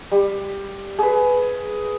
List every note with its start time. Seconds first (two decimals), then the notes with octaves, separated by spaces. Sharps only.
0.12 G3
0.99 G#4 B4